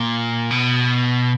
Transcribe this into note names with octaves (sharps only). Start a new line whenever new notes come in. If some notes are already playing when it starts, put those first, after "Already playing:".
Already playing: A#2
B2